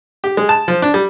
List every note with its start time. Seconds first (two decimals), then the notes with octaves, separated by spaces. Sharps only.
0.24 G4
0.37 G#3
0.49 A5
0.68 F3
0.82 D4
0.94 G3